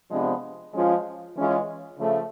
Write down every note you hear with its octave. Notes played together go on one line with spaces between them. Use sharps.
C3 F3 G#3 B3 D4
F3 G#3 C#4 F4
E3 G#3 C#4 F4
C#3 F3 A3